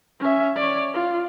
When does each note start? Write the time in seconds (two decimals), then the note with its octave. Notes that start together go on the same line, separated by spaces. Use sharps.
0.20 C#4 E5
0.56 C#5 D5
0.94 F4